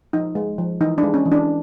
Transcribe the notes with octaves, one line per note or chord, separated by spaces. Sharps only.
F3 D#4
G#3
F3
E3 D#4
D4
G#3
C#4
E3
D4